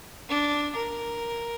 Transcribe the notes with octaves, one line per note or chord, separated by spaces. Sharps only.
D4
A#4